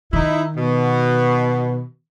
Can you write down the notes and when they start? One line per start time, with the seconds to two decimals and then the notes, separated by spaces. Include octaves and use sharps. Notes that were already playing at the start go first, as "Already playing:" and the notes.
0.13 D#3 D#4 E4
0.55 B2